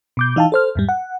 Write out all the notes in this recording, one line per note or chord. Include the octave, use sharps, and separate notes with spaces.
B2 D6 G6
E3 D#4 F5 G5 A5
A4 C5 F6
E2 G#2 G3
F#5